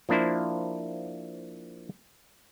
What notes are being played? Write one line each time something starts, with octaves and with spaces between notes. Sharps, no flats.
F3 A#3 D4 E4 C5